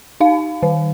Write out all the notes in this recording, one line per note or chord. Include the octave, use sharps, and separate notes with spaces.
D#4 F5
D#3